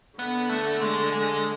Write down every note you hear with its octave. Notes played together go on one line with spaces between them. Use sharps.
D3 B3
A3
G#3
G#3